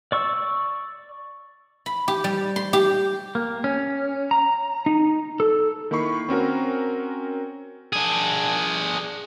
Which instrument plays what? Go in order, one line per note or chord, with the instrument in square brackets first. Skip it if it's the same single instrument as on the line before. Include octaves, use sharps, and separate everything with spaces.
[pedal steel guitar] D5 C#6 E6
[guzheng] B5
G4
G3
C6
G4
[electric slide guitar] A#3
C#4
A#5
D#4
A4
[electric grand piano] D#3 A#3 E4 B5 C#6 C7
C4 C#4 F#4 A#4
[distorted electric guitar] D4 G#4